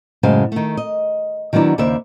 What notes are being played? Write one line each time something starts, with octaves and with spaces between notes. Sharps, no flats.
F#2 A2 C#3 G#3 C5
D#3 A3
D#5
D#3 F#3 B3 D4 E4
D#2 C#3 E4 C5 D5 E5